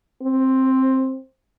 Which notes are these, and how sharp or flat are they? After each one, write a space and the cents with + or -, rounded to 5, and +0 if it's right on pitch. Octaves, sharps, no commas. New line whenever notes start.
C4 +10